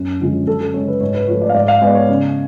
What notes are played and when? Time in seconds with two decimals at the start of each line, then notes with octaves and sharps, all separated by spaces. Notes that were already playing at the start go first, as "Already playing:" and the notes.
Already playing: F#2
0.20 D3 F3 G#3 C#4
0.47 F#2 A4
0.61 A4
0.74 C#3 G#3 C#5
0.88 B4
1.01 G#2 C#5
1.14 B4
1.28 F3 A3 C#5
1.42 D5
1.49 F5
1.54 G#2 D5
1.68 F5
1.81 G#3 B3 D5
1.95 C#5
2.09 C#3